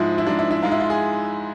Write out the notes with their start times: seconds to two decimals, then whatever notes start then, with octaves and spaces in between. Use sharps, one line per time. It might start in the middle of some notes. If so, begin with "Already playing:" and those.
Already playing: G#2 F3 G#3 E4
0.18 E4
0.26 G#2 F3 G#3 D4
0.39 E4
0.51 E4
0.62 G#2 G#3 F4
0.71 E4
0.80 F4
0.90 G#4